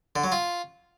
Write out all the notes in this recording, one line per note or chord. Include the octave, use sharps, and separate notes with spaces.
D3
F#3
F4